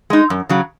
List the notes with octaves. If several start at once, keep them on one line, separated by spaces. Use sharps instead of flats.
G#3 D#4
F#2
C#3 F#3